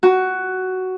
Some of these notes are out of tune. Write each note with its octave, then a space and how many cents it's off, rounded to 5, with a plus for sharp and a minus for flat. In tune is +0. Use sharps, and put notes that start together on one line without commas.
F#4 +10